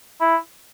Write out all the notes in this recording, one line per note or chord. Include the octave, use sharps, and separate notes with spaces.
E4